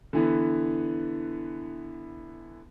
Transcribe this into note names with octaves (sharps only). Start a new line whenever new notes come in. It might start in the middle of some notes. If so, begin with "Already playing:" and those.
D3 E3 B3